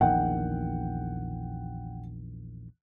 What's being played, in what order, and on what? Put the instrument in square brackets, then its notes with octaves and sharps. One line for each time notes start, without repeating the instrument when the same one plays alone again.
[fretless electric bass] A#1 E2 D#3 [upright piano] F#5 G5